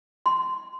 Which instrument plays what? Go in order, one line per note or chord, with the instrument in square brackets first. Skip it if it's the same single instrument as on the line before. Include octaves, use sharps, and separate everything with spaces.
[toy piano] C6